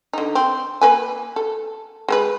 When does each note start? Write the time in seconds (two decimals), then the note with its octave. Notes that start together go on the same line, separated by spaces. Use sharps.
0.13 D3 D#4
0.35 C4
0.81 A#3 B4 G#5
1.36 A4
2.08 G#3 A#4 B4